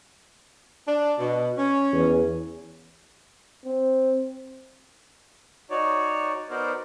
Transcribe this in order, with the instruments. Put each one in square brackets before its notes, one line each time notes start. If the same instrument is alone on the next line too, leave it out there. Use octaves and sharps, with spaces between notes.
[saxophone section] D4
B2
C#4
[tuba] E2
[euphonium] C4
[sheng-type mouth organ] D#4 F#4 C#5 D5
B3 D#4 F#4 A#4 C5 D5